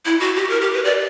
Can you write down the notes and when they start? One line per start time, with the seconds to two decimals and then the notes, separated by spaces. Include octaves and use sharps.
0.05 E4
0.20 F#4
0.36 G4
0.50 A#4
0.61 G4
0.74 B4
0.85 D5